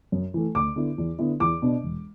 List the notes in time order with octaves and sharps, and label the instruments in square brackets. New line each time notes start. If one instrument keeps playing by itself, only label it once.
[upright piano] F#2
E3 A3
D2 D6
D3 B3 E4
E2
D3 B3 E4
E2 D6
B2 B3 D4
E1